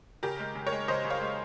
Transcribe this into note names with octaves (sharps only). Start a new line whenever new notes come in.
C#3 G4 A#4
G#3
C#3
A#4 C#5
G#3
C#3 C5 D#5
C#3
C#5 F5
G#3